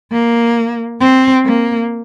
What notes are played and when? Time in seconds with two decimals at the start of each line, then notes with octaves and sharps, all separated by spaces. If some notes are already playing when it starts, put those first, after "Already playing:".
0.12 A#3
1.00 C4
1.45 A#3